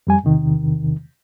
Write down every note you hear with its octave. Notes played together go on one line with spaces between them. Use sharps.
F2 G3 G#5
E2 C3 D#3